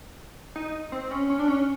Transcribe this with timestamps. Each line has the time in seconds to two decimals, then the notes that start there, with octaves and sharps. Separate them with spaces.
0.56 D#4
0.92 C4
1.11 C#4
1.30 C#4
1.39 D4
1.48 C#4